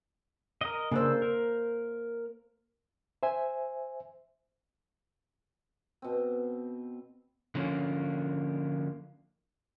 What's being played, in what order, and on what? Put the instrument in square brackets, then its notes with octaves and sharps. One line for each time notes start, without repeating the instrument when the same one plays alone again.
[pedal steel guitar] A#4 D#5
[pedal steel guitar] C#3 D4 E6 [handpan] A#3 C5
[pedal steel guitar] A#4
[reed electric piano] C5 E5 G#5
[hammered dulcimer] B2 C4
[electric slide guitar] D3 F3 A#3 C#4